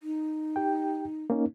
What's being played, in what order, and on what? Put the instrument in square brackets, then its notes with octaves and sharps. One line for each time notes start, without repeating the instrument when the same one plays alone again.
[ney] D#4
[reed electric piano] G4 G5
A#3 C#4 D#4